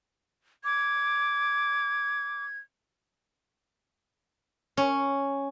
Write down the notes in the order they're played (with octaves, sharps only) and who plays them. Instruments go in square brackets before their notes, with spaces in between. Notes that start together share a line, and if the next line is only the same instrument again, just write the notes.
[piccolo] D6 [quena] G#6
[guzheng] C#4